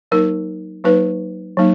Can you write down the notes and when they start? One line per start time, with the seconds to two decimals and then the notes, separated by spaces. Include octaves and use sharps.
0.11 F#3 A#3 D#4 A#4
0.84 F#3 A#3 D#4 B4
1.57 F#3 A#3 D#4